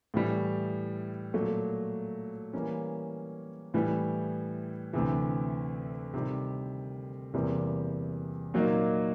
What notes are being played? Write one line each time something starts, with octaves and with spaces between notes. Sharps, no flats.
A2 E3 G3
A#2 F#3 A3
E3 G3 A#3 C#4
A2 E3 G3
D2 C3 E3
C3 D#3 G3
E2 C3 E3 G3 A#3
A#2 F#3 A#3 D#4